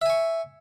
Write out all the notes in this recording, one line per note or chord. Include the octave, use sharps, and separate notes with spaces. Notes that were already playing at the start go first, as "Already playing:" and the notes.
E5 G#5 C#6